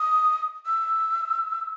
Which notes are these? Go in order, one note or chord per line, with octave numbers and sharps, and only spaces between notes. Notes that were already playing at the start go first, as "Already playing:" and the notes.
Already playing: D#6
E6